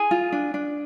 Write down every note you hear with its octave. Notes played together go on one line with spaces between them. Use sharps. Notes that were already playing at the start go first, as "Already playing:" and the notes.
Already playing: G#4 G#5
F4
D4
D4